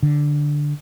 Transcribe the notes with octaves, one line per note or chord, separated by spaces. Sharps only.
D3